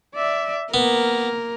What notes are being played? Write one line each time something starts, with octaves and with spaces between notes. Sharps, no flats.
D5 E5
A#3 B3 A#4